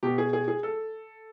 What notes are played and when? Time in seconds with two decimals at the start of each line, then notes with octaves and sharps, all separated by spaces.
0.03 B2 G4
0.18 G#4
0.33 G#4
0.48 G#4
0.63 A4